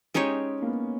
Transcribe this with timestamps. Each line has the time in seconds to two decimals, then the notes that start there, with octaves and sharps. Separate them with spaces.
0.14 G#3 C#4 D#4 G4 C#5
0.62 A#3
0.67 B3